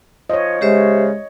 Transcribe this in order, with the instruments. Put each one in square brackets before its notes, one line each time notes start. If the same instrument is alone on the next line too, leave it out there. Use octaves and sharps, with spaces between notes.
[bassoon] F3 [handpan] C#5 D#5
[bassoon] C#3 [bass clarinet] G#3 [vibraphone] G4 C5 E5